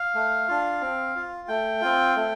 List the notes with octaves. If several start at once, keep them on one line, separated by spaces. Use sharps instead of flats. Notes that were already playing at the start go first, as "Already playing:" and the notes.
Already playing: F5
A3
D4 F4
C4
F4
A3 G5
C4 F4
A3